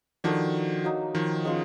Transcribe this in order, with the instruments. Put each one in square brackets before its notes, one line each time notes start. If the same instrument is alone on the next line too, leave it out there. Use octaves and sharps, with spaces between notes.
[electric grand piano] D#3 F3 [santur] D4 F#4 A4 D5
[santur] F#3 A#3 D#4
[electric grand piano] D#3 F3
[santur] G#3 C#4 F4